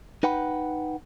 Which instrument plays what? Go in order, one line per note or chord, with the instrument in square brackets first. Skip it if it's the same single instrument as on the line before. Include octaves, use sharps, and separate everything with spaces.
[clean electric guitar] D#4 B4 F#5 G5 B5